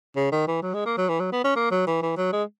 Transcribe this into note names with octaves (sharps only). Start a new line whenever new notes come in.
C#3
D#3
E3
F#3
G#3
A#3
F#3
E3
F#3
B3
C#4
A#3
F#3
E3
E3
F#3
G#3